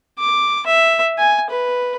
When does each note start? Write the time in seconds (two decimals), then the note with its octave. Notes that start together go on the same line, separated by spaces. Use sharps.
0.19 D6
0.66 E5
1.18 G#5
1.50 B4